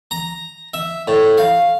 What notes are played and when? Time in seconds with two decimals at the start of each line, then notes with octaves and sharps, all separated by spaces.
0.11 A#5
0.74 E5
1.07 A2
1.38 F5